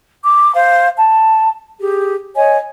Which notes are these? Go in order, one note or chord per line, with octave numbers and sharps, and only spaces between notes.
D6
C5 F5
A5
G4 G#4
C#5 D#5 G#5